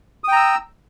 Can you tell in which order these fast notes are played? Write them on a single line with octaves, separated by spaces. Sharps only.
D#6 G5 A#5 E6